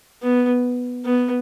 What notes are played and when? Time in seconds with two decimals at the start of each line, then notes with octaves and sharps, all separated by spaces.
0.22 B3
1.05 B3